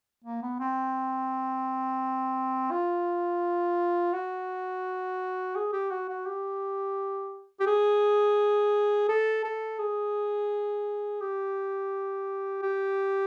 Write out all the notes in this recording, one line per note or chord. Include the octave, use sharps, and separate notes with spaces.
A#3
B3
C4
F4
F#4
G#4
G4
F#4
F#4
G4
G4
G#4
A4
A4
G#4
G4
G4